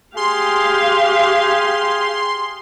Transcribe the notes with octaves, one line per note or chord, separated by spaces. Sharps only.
G4 G#4 F5 C6